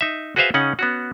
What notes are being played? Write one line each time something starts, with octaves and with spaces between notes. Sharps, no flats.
D#4 E5
F#4 G#4 B4 C5 E5 F5
C#3 C#4 D#4 F#5
B3 C#4 F#4